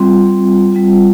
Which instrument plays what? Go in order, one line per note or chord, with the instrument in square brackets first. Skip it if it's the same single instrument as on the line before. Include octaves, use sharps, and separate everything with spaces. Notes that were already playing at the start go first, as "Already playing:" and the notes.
Already playing: [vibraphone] G3 C4 F4
G3 C4 F4